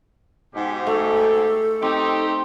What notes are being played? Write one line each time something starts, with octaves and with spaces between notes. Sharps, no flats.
G#2 B2 G4
A3 A4
C4 D#4 G4